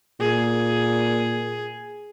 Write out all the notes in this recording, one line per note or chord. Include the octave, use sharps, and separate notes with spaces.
A#2 G#4